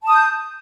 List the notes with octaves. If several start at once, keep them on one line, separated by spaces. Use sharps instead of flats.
A5 D#6 G6